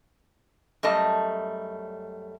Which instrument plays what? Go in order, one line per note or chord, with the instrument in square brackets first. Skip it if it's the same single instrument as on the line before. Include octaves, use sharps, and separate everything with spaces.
[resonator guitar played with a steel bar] F#2 G3 A3 D#5 A5